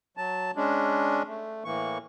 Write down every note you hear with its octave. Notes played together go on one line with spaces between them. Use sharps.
F#3 A5
G#3 C#4 D4
A3
A2 E3 A#3 C#6